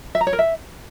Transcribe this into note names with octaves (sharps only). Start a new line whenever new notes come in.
E5
A#5
C#5
A#4
E5